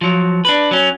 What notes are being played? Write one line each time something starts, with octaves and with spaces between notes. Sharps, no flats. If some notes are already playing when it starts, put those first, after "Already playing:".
F3 F#3
D4 B4
F#3 C#4